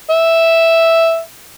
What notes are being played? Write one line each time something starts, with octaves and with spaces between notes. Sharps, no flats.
E5